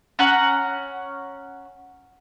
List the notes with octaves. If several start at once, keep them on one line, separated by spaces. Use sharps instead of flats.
C#4 F#5 A#5